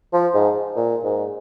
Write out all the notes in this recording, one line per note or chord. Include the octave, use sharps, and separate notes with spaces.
F3
G#2
A#2
G#2